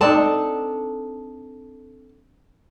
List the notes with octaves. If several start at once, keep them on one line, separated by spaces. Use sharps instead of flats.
C4 D4 D#4 A4 A5